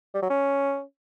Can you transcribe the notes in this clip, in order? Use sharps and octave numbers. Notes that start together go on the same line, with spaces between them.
G3
F#3
C#4